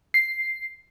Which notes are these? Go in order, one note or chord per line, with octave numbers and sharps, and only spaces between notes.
C7